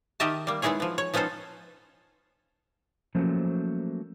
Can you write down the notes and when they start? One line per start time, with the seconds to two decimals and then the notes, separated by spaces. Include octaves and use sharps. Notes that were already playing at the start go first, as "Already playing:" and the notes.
0.20 D#3 G4 A#4 D#5 E5 A5
0.47 G3 A#3
0.62 G#3 B3 D#4 E4 G#4 C#5
0.80 F3 B3
0.98 C#5
1.14 F3 B3 C#4 D#4 A4 C5
3.15 F3 F#3 A3 A#3 C#4 C5